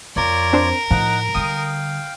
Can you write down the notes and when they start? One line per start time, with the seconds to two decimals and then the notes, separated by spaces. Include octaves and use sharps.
0.16 F2 F4 A#4 C#5 D5
0.53 C4 D4 C5
0.91 A2 F3 D#4 F#5
1.35 D3 G3 F5 G5 D#6